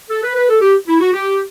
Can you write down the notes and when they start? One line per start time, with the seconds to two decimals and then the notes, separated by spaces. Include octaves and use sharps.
0.09 A4
0.23 B4
0.36 B4
0.49 A4
0.61 G4
0.87 E4
1.00 F#4
1.13 G4